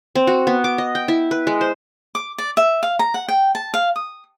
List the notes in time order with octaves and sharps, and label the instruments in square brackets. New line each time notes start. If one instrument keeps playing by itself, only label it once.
[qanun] C4
F#4
B3
D6
D#5
G5
E4
B4
G#3
C5
[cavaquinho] D6
D5
E5
F5
A#5
F#5
G5
A5
F5
D#6